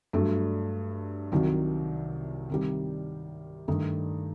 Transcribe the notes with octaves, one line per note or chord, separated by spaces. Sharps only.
G2 F#3 A3
C2 C3 D#3 F#3
C3 D#3 G3
G2 D#3 A3 D#4